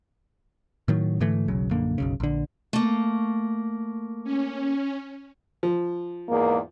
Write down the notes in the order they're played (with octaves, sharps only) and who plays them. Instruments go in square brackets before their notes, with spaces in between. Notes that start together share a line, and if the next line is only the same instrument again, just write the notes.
[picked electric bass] A2 D#3 F#3
G#2 D3 E3 A3
E1 B1 C#3 F#3
A#1 F#2 D3 A#3
F#1 B1 C#3
A#1 D3
[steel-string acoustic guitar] A3 A#3
[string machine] C#4
[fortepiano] F3
[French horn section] E2 G#2 A#3